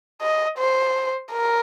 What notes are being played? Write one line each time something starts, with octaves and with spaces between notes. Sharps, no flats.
D#5
C5
A#4